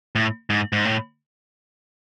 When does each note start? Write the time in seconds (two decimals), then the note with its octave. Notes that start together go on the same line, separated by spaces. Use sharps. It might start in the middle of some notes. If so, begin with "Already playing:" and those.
0.15 A2
0.50 G#2
0.73 G#2
0.85 A2